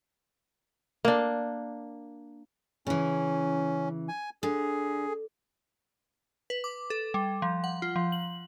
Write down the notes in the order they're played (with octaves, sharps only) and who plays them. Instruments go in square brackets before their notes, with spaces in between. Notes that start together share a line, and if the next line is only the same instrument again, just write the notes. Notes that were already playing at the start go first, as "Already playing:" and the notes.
[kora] A#3 D4
[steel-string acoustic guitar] C#3 E3 [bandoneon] C#4
[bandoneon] G#5
[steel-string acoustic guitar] D3 [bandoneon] G#4
[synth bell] B4
D6
A4
G3
F3
F#5
F4
F3
F#7